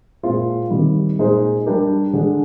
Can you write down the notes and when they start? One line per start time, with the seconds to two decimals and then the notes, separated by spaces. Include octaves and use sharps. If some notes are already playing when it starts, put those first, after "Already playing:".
0.23 A#2 G#3 C4 F4
0.70 C3 D#3 G3
1.19 A#2 G#3 D#4 G#4 C5
1.66 G3 D4 G4 A#4
2.13 D3 G#3 D4